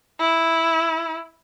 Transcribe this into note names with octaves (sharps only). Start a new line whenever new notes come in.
E4